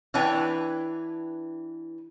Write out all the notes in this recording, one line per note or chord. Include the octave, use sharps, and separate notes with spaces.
E3 D4 B4 C#5 G5